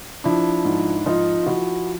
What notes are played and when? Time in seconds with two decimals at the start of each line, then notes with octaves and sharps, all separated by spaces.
0.24 F3 D4 E4
0.65 G#2
1.06 F3 D#4 F4
1.43 F4
1.46 F3 E4 F#4